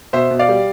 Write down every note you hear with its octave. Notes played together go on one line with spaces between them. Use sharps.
B2 C5 E5
B2
D5 F5
G3